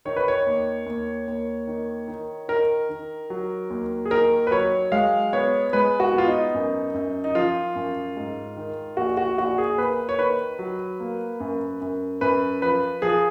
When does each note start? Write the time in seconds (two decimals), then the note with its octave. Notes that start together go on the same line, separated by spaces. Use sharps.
0.05 D#3 C#5
0.16 B4
0.28 C#5
0.47 D#2
0.86 D#2
1.27 D#2
1.67 D#3
2.08 D#3
2.48 D#3 A#4
2.89 D#3
3.30 F#3
3.70 D#2
4.05 G#4
4.11 D#3 A#4
4.47 B4
4.51 F#3 C#5
4.92 G#3 F5
5.33 B3 C#5
5.73 G#3 B4
6.00 F#4
6.13 B3 F4
6.28 D#4
6.54 F#2
6.94 F#2
7.24 D#4
7.35 F3 F4
7.75 F#2
8.17 G#2
8.57 D#3
8.97 A#1 F#4
9.17 F#4
9.38 A#1 F#4
9.58 G#4
9.78 A#3 B4
10.09 C#5
10.19 D#3 B4
10.59 F#3
11.00 A#3
11.40 F#2
11.81 F#2
12.21 F#2 B4
12.62 F3 B4
13.02 F3 G#4